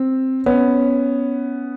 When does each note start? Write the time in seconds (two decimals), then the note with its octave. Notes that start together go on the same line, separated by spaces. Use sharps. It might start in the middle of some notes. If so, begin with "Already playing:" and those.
Already playing: C4
0.46 B3 C#4